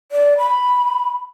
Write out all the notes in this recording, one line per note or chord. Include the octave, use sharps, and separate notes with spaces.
D5
B5